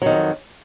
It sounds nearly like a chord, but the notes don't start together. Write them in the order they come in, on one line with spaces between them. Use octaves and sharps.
F#3 D#3 F2